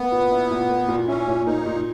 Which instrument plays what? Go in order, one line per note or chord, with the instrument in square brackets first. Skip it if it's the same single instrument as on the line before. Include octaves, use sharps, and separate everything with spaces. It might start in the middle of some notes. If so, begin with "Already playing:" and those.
Already playing: [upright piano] A#3 [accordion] B3
[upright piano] A#2
E4
A#2
A#3
A#2
[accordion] C#4 [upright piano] E4
[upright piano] A#2
[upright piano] A#3 [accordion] D#4
[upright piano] A#2